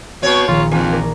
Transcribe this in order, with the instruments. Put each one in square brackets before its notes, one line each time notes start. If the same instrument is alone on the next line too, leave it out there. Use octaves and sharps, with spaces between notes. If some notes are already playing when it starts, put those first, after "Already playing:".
[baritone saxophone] B2 [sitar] C4 C#5 [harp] D#5
[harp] A#1 D#3 [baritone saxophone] F4
[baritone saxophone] F2 [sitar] E3 [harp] C5 D5 G#5
[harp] A#4 D5